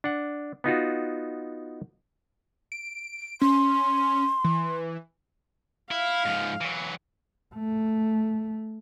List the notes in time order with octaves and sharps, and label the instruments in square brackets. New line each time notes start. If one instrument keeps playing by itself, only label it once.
[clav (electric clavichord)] D4 F#5
B3 D#4 F4 F#4
[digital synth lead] D7
[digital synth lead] C#4 [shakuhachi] C6
[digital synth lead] E3
[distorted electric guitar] E4 [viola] F5
[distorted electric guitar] G#2 F3
E3 F#3
[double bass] A3